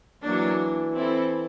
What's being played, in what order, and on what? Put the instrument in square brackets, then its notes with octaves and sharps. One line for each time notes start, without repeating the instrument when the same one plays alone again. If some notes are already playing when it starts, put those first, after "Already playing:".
[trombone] E3 [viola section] F#3 A#3 D4
[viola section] C4 E4 A4